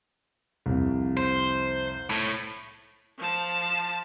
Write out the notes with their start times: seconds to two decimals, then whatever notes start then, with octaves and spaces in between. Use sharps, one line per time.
0.66 C2 F2
1.17 C5
2.10 A2
3.18 F3 A5